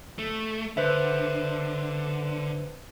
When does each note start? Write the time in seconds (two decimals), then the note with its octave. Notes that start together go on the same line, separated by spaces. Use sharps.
0.19 A3
0.77 D3 B4 C5 E5